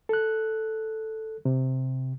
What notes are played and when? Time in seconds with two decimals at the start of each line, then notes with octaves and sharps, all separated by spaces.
0.09 A4 F#6
1.45 C3